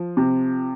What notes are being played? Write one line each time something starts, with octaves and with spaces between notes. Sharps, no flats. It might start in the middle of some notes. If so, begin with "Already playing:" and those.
Already playing: F3
C3